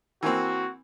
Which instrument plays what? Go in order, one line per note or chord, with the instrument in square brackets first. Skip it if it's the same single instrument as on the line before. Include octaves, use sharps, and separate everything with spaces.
[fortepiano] E3 A#3 C4 [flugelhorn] F#4